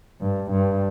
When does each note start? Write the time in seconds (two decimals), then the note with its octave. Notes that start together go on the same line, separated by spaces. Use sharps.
0.21 G2
0.51 G2